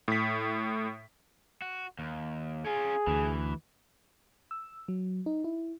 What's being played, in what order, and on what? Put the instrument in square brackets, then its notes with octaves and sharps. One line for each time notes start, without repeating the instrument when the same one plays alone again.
[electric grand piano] A2 B6
[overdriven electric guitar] F#4
D#2
[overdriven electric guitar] C#4 F4 [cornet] G#4
[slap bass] D2 [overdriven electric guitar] E3
[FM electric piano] E6
F#3
D#4
E4